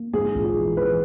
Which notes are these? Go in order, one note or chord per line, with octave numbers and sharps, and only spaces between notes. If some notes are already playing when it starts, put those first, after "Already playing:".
Already playing: A#3
G#2 G#4
A#1
G#4
E3
E3 B4